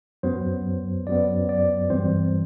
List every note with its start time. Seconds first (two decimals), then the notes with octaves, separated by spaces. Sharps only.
0.23 F#2 F#3 B3 C5
1.07 F#2 F#3 B3 D5
1.49 D5
1.90 G2 E3 G3 C4 C5